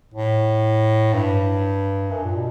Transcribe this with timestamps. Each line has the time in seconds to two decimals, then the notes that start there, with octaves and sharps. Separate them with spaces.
0.14 A2
1.14 G2
2.11 F#2
2.24 A#2
2.36 B2